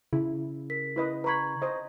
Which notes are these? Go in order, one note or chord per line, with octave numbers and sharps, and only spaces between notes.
C#3 E4
A#4 B6
E4 B4 D#5
B4 A#5 B5 C#6 G#6
C5 D#5